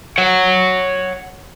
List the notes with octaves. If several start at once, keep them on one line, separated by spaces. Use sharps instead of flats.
C#5 F#5